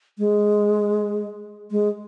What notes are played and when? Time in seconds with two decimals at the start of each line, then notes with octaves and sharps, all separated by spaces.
0.18 G#3
1.71 G#3